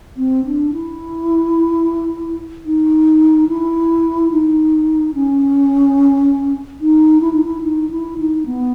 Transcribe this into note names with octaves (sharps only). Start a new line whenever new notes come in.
C4
D4
E4
D#4
E4
D#4
C#4
D#4
E4
D#4
E4
D#4
E4
D#4
B3